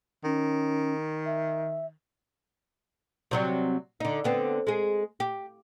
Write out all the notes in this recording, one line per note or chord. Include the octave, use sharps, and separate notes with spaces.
D#3 C#4
E5
C3 F#3 G3
D3 D#4
D3 B3 C4
G#3 G#4
G4